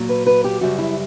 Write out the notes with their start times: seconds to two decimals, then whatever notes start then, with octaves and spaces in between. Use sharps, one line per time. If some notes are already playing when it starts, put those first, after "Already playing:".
Already playing: A#2 F#3
0.09 B4
0.27 B4
0.44 G4
0.61 F#2 C#3 G3 F#4
0.78 E4